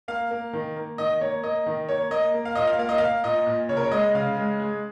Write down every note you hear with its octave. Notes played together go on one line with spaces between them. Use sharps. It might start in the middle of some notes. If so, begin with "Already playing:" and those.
A#3 F5
A#3
D#3
A#3
D#3 D#5
A#3 C#5
A#3 D#5
D#3
A#3 C#5
A#3 D#5
A#3
F5
A#2 D#5
F5
A#3 F5
D#5
A#3 F5
A#2 D#5
A#2
C#3 C#5
A#4
C#5
G#3 D#5
C#3 F5
G#3
G#3